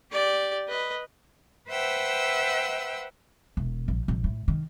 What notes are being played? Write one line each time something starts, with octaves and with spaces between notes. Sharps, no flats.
G4 D5
B4 D#5
B4 C5 E5 F#5 G5 E6
E1
A#1
A#1
A2
D#3